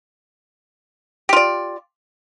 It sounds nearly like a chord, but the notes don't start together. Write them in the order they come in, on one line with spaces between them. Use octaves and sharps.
G4 F4 D5